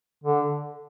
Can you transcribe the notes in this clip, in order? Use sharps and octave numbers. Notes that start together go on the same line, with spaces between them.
D3